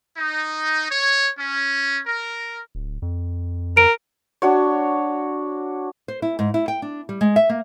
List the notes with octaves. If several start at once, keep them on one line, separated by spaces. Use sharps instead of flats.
D#4
C#5
C#4
A#4
D1
F2
A#4 D7
D4 F#4 C#5
C5
E4
G#2
E4
G5
D4
G3
G#3
E5
A#3